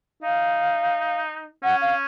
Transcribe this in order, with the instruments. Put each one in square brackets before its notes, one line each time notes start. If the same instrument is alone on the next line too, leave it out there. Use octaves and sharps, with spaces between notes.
[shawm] D#4 [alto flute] F5
[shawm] C#4 [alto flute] F#5
[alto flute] F5